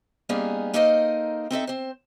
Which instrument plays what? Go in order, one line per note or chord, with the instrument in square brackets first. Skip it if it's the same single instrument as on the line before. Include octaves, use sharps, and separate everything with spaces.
[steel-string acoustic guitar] G3 A#3 B3 C#4 D#4 G#4
A#3 D#4 A4 A#4 C5 D#5
C4 D#4 A4 E5
C4 C5